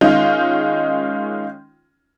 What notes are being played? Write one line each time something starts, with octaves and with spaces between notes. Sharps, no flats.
D#3 G#3 C#4 D#4 F4